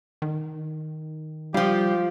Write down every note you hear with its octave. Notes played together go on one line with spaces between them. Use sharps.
D#3
F3 G3 F4 G4